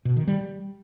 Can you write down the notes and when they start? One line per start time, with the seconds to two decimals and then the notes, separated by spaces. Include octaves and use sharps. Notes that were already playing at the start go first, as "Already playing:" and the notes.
0.05 B2
0.16 D#3
0.28 G3